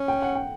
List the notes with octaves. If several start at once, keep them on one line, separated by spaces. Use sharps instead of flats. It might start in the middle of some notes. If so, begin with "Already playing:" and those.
Already playing: C#4
G5
F#5
G5